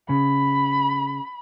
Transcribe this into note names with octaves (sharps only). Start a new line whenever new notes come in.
C#3 B5